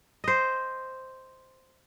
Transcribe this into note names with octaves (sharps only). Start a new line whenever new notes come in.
C5 D#5